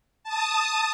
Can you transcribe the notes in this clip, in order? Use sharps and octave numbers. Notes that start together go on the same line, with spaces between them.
A5 D#6